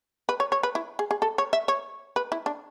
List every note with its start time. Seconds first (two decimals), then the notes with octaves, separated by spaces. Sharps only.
0.29 B4
0.40 C#5
0.52 C#5
0.63 B4
0.75 E4
0.99 G#4
1.11 G#4
1.22 A4
1.38 C#5
1.53 E5
1.68 C#5
2.16 B4
2.32 E4
2.46 D4